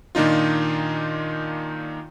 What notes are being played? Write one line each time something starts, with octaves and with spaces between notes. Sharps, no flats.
A#2 D#3 D4 D#4 F4